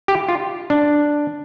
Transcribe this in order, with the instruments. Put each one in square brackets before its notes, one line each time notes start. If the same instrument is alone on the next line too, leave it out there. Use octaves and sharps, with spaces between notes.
[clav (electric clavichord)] G4
F4
D4